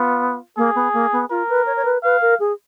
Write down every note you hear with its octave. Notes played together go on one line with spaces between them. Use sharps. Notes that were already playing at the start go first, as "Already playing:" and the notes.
Already playing: B3 F4
A#3 G#4
B3
A#3
B3
F4 A#4
B4
C#5
C#5
B4
B4 F5
A#4
G#4